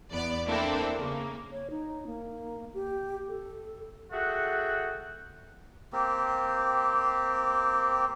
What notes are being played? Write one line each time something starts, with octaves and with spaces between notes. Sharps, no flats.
E2 B3 D5
A#3 C4 D4 E4 A4
C#3 A#3
C#5
D#4
A#3
G4
A4
F#4 G#4 A4 E5 F#5 G5
A#3 C4 G4